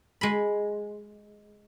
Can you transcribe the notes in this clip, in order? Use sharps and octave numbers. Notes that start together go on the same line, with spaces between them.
G#3 B5